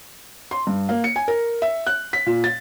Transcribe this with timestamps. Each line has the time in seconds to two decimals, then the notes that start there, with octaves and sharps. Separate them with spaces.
0.51 C6
0.67 G2
0.89 A#3
1.04 C#7
1.16 G#5
1.28 A#4
1.62 E5
1.87 F#6
2.13 B6
2.26 A#2
2.44 A6